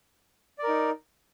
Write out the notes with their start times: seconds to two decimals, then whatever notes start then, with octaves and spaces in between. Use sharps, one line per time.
0.58 D5
0.63 A#4
0.68 D#4